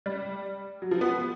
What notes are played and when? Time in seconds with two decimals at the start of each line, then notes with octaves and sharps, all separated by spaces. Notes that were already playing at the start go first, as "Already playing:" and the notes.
0.06 G3
0.82 F#3
0.91 F3
1.01 B3